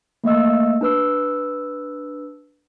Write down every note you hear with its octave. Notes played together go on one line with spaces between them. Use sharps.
A3 A#3 D#5 E6
D4 B4 E6